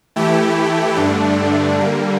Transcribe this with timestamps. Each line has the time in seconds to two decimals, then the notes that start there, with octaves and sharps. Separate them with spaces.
0.16 E3 A3 E4 G4
0.96 G2 D3 A3 D4
1.76 D3 G3 A#3